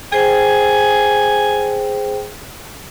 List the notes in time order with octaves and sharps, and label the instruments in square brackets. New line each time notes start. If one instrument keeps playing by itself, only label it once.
[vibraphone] G#4 C5 G5 [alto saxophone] G#5